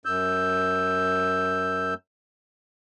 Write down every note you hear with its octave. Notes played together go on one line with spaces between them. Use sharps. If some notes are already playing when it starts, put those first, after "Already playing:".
F#2 E6 G6